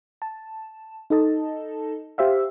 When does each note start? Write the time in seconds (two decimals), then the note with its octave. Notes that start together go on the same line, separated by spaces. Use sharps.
0.22 A5
1.10 D#4 A4 D#5 A5
2.18 G4 C5 E5 F5